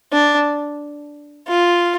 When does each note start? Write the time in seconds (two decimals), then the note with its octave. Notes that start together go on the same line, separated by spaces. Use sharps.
0.12 D4
1.48 F4